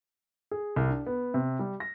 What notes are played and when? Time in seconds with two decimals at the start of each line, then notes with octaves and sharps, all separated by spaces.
0.51 G#4
0.76 C2
0.90 D4
1.06 B3
1.34 C3
1.59 G3
1.80 A#6